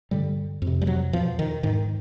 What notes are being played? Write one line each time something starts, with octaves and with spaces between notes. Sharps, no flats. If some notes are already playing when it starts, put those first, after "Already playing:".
G2 D3 G3
F2
C3
G3
F#3
E2 B2 F3
D#3
G#2 D#3